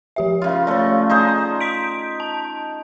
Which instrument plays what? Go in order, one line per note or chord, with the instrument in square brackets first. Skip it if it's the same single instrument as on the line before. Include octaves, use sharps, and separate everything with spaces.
[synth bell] F3 G4 E5
[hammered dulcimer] C#3 F4
[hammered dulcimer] A3 C#6 [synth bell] C#5 D5
[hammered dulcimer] D#4 G#4 C5 [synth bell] D5
[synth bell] C6 B6 D7
A5